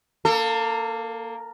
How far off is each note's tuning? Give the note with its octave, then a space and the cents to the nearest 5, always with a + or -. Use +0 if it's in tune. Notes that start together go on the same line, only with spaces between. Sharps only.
A#3 +0 A4 +30